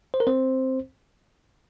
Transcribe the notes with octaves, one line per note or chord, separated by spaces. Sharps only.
C5
A#4
C4 C5